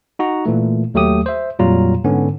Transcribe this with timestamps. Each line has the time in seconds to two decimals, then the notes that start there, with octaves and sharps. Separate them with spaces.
0.19 D#4 F#4 A#5
0.46 A#2 E3 A3
0.94 D#2 F#3 A3 G4 D#6
1.26 C5 E5
1.59 F2 A#2 F#3 G3 F4 A#5
2.04 G#2 D3 B3 C#4